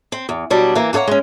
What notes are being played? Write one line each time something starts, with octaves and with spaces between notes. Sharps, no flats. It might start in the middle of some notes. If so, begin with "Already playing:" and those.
C4
E2
B2 F#3 G3 D4
E3 A#3
A#3 F#4 A4 C#5 F#5
G#3 C#4